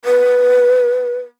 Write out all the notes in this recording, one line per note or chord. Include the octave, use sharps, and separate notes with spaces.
B4